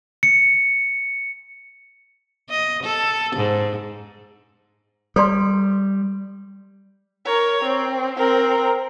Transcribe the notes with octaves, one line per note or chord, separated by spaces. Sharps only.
C#7
D#5
A4
G#2
G3 A4 D5 C6
A#4 C#5
C4
C4 A#4